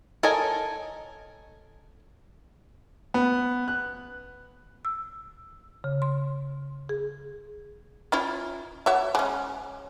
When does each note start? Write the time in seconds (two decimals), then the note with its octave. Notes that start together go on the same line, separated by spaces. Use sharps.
0.23 A4 A#4 C#5 D#5 G#5
3.14 B3
3.68 F#6
4.85 E6
5.84 C#3
6.02 C6
6.89 G#4
8.12 C#4 E4 F4
8.86 F#4 C#5 E5
9.15 G#3 C#4